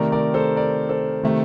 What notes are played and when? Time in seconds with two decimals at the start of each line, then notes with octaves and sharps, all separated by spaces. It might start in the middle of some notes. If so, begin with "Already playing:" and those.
Already playing: C3 D#3 A3 A#4 D5
0.12 A#4 D5
0.34 A4 C5
0.56 A#4 D5
0.89 A4 C5
1.23 C3 D#3 A3